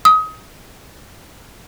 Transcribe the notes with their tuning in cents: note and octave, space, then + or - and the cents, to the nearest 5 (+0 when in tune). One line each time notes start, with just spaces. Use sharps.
D#6 +25